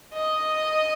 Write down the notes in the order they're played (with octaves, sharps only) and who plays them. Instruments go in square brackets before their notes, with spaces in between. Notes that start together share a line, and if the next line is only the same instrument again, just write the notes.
[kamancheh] D#5